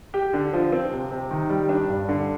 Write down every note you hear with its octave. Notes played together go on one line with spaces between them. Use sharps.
G4
D3
F3
C4
C3
C3
D#3
G3
D4
G2
D3